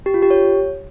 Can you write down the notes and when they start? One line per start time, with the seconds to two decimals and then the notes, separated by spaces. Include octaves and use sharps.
0.06 G4
0.14 F4
0.22 G4
0.31 C#5